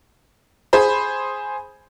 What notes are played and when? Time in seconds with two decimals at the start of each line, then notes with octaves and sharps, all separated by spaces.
0.73 G#4 C5 B5